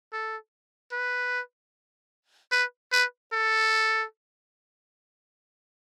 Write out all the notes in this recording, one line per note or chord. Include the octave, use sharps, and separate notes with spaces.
A4
B4
B4
B4
A4